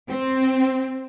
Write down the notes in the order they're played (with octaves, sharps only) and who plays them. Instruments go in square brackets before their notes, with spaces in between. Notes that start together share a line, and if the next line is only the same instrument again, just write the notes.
[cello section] C4